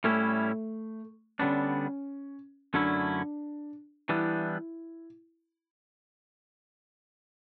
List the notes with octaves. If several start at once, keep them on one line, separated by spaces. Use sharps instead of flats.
A2 G3 A3 C#4 E4
D3 G3 B3 C#4 D4
F#2 D3 A3 C#4 D4 E4
E3 G3 B3 D4 E4